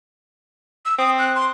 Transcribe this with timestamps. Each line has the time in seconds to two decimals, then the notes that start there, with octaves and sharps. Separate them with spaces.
0.85 E6
0.99 C4 D#6
1.19 F#6
1.35 C6